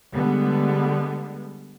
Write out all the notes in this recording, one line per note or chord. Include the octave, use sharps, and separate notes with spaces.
D3 G3 G#3 B3